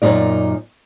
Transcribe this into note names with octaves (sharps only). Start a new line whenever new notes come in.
F#2 A#2 F3 F#3 D#4 D5